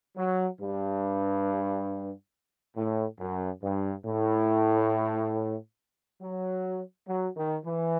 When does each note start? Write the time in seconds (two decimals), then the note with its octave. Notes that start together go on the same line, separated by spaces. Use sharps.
0.17 F#3
0.61 G2
2.76 A2
3.19 F#2
3.62 G2
4.05 A2
6.21 F#3
7.08 F#3
7.36 D#3
7.65 E3